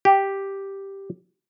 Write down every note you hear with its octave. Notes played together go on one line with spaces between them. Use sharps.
G4